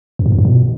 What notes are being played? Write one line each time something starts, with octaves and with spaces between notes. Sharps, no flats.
F#2
G#2
F#2
G#2
B2